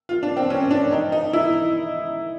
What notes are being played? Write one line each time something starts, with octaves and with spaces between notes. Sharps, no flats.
F4
D4
C4
C#4
D4
D#4
D#4
E4